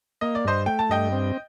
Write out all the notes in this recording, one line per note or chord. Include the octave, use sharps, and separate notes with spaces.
A#3 D#5
D5
G2 C5 D#5
A3 G5
A5
G2 D#5 G5
C4